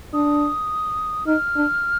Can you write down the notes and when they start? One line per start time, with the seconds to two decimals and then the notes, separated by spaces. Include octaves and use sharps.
0.13 D4 D#6
1.27 D#4 F6
1.56 D4